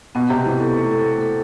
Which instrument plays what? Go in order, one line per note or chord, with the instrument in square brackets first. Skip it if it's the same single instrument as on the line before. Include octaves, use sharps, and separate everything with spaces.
[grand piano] B2 [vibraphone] B3
[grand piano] C3 [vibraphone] G4
[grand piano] E3 [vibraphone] B3
[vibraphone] A4
A3
A4
A3
A4